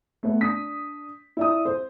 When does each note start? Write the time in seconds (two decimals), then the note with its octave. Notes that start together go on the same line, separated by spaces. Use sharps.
0.23 A3 B3
0.41 D4 D#6 B6
1.37 E4 D5 D#6
1.65 C5